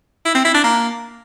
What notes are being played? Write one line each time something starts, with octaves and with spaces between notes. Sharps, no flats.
E4
C4
E4
D4
A#3